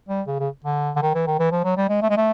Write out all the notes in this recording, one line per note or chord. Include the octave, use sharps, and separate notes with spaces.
G3
C#3
C#3
D3
D3
D#3
E3
D#3
E3
F3
F#3
G3
G#3
A3
G#3
A3